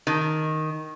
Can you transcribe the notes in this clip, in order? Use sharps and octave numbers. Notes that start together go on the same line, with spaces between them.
D#3